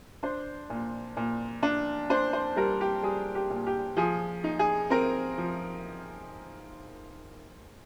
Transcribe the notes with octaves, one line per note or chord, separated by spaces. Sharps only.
D4 C5
A#2
A#2
D4
D4 C5
C5
G3 A#4
G4
G3 G#4
G4
A#2
G4
F3 G#4
D#4
G#4
C4 A#4
F3